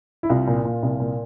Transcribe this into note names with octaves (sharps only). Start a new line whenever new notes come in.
E4
C2 F4
A#2
A#2
C2
A#2